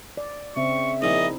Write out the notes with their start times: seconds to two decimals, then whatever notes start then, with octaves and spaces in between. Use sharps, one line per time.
0.17 D5
0.56 C#3 C4 E5 C#6
1.02 A#1 A#2 D#4 E4 D#5